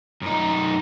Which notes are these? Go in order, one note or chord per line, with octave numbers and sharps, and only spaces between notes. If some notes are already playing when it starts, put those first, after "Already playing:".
F#2 D#4